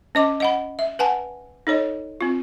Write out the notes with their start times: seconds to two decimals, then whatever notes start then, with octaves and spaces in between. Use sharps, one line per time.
0.15 C#4 D#5 D6
0.40 D#5 F#5 B5
0.79 E5
0.99 B4 F#5 G#5 A5
1.67 D#4 A4 C#5 D#5
2.21 C4 F4